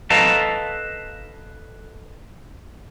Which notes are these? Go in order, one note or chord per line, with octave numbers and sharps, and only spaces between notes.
A4 B4 D#5 F5 A5 A#5